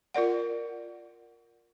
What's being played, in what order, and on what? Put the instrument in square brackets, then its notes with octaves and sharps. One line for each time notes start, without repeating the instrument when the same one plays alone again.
[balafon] F4 A#4 D5 F#5